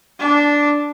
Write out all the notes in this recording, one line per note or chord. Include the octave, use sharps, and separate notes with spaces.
D4